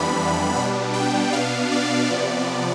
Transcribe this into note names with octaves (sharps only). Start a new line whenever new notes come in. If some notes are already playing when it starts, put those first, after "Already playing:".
Already playing: F2 E3 G3 B3 D4 B5
B2 G3 B3 D4
G5
B2 B3 D4 F5
D5
C3 F3 B3